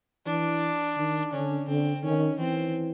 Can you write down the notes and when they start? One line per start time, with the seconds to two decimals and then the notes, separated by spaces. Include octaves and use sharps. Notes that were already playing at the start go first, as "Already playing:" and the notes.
0.26 E3 D4
0.97 D#3
1.33 D3 C#4
1.68 D3 C4
2.03 D#3 C#4
2.39 E3 C4